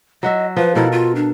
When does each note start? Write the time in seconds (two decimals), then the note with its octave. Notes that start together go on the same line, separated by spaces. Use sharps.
0.23 F#3 F#4 D#5 E5
0.57 F3 B4
0.75 B2 E4 A4 A#4
0.92 F4
1.15 D4